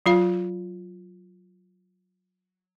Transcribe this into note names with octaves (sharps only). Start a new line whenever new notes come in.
F#3 F4 F5